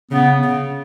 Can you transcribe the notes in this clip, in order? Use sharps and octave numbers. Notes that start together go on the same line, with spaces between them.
C#3 B3
C#3